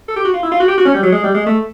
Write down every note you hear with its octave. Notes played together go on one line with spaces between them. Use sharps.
A4
G4
F#4
F4
E4
F4
F#4
G4
F#4
C#4
G3
F#3
G#3
G3
G#3
A3